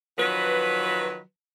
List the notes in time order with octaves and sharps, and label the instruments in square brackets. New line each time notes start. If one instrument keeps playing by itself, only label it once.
[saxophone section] D#3 F3 F#3 B4